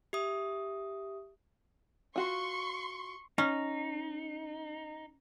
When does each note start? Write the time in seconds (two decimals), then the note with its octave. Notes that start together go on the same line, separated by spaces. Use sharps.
0.13 G4 E5 D#6
2.16 F4 F#4 C6 C#6
3.38 C#4 D#4